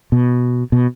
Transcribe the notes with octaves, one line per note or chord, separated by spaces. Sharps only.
B2
B2